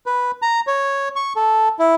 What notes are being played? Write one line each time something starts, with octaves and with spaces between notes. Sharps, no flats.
B4
A#5
C#5
C#6
A4
E4